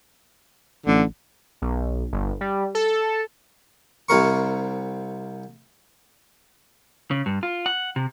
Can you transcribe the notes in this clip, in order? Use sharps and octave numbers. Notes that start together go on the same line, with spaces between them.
A1 D3
B1
G1
G3
A4
C2 C3 A#4 C#6
C#3
G2
F4
F#5
C3